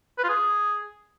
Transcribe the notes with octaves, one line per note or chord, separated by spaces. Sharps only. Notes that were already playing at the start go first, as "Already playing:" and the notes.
B4
F4
G#4